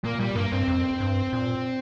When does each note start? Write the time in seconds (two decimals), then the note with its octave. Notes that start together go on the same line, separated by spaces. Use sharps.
0.04 A#2 A#3
0.19 A#2 G3
0.35 G2 A#3
0.52 G2 C4
0.68 F2
1.00 G2
1.33 A#2